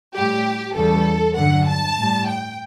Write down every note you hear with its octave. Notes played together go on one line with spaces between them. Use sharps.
A2 G3 G4
E2 C#3 G3 A4
G2 D3 F#3 F#5
A5
A2 G3
G5